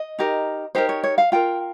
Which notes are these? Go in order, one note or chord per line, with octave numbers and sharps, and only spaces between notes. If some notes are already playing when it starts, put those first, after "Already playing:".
Already playing: D#5
D#4 G4 A#4
D#4 G4 A#4 C5
C#5
C#5
F5
F4 A#4 G5